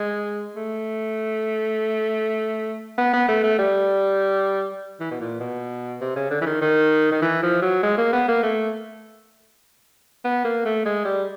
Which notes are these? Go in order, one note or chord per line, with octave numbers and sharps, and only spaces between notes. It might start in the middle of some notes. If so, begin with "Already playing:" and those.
Already playing: G#3
A3
B3
B3
A3
A3
G3
E3
B2
A#2
B2
C3
C#3
D3
E3
D#3
D#3
D#3
E3
F3
F#3
G#3
A#3
B3
A#3
A3
B3
A#3
A3
G#3
G3